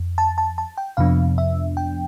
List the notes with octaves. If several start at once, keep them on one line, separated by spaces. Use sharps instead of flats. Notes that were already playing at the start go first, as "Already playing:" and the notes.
Already playing: F2
A5
A5
A5
G5
F2 C3 F3 B3 D4 F5
E5
G5